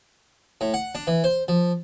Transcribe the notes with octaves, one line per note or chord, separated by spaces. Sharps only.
A2
F#5
D4
E3
C5
F3